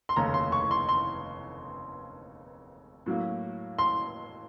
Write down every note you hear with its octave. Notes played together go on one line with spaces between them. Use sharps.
C6
F1 D#2 C#3 A3 C#4 A#5
C6
C#6
C6
C6
A2 F#3 A#3
C6